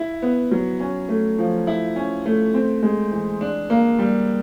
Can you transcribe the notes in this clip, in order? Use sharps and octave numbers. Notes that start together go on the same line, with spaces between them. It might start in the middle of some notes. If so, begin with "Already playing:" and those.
Already playing: E4
B3
F#3
C#4
A3
F3
E4
C#4
A3
C4
G#3
E3
D4
A#3
G3